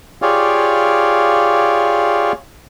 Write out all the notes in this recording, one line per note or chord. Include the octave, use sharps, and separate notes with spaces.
F4 G4 G#4 C#5 D5 F5